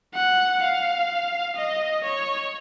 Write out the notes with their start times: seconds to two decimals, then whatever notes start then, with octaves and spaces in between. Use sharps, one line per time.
0.14 F#5
0.62 F5
1.56 D#5
2.04 C#5